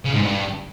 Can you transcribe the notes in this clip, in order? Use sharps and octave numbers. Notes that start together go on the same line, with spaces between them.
C#3
G#2
G2